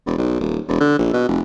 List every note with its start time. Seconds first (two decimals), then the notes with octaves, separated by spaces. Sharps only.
0.06 E1
0.18 B1
0.40 D#1
0.68 E1
0.80 D3
0.99 A#1
1.13 B2
1.28 F1